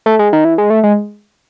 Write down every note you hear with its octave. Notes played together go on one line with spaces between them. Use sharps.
A3
G#3
D#3
E3
G#3
A3
G#3